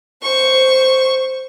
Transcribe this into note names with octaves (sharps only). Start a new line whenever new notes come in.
C5 C#6